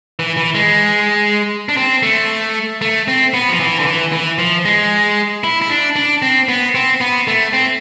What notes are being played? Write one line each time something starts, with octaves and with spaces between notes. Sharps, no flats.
E3
E3
G#3
D4
C4
A3
A3
C4
B3
F3
E3
D3
E3
E3
F3
G#3
E4
E4
D4
D4
C4
B3
C4
B3
A3
C4